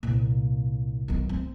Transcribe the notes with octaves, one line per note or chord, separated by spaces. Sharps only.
C2 A#2
B1 D#3
C4